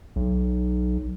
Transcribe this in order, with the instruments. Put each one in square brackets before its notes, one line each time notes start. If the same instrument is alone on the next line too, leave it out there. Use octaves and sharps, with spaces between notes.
[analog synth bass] B1